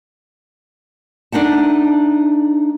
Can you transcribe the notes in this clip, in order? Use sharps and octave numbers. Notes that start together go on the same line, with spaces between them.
A3 D4 D#4 F#5 A5